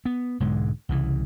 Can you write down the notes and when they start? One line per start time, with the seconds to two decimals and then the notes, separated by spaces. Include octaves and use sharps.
0.05 B3
0.40 B1 G#2 D3 G#3
0.89 C2 C#3 E3